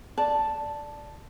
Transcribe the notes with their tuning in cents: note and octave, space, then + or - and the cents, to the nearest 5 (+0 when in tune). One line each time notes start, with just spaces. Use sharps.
D5 +0 A5 +0